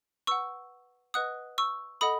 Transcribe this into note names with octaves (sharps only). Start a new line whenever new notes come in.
B4 F#5 C#6 E6
B4 D#5 F#5 D#6 F#6
C#6 E6
A4 D#5 F#5 B5 D#6